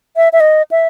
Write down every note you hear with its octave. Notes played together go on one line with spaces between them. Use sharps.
E5
E5
D#5
E5